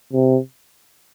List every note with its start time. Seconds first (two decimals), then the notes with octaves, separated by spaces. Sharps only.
0.13 C3